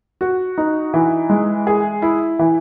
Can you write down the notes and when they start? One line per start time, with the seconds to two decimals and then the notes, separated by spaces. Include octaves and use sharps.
0.21 F#4
0.58 D#4
0.94 E3
1.30 G#3
1.67 G#4
2.02 E4
2.39 E3